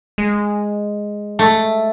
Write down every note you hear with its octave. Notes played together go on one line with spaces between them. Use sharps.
G#3
A3